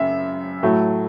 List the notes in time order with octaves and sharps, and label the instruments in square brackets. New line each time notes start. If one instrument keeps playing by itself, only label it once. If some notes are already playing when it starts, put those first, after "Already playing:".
Already playing: [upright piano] F#2 C#3 E5
A2 F#3 A3